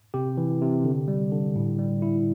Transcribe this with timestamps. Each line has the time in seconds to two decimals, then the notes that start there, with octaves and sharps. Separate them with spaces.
0.14 C3 G4
0.37 E3
0.61 C3
0.85 D3
1.08 G3
1.31 D3
1.56 A2
1.79 G3
2.02 E4